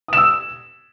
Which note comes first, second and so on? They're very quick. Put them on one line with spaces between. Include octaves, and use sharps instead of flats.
D#6 E7 E6